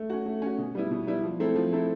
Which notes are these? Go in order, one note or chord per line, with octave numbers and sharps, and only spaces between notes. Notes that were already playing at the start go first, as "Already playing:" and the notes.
Already playing: A3
C#4 F#4
A3
C#4 F#4
B2
G3 B3 E4
B2
G3 B3 E4
F3
A3 C4 E4 A4
F3
A3 C4 E4 A4